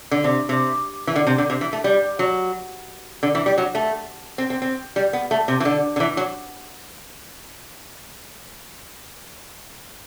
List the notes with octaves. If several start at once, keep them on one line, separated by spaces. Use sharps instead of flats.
D3
C3
C3
E3
D3
C3
D3
C3
E3
A3
G3
F#3
D3
E3
G3
F#3
A3
C4
C4
C4
G3
B3
A3
C3
E3
D3
D3
E3
F#3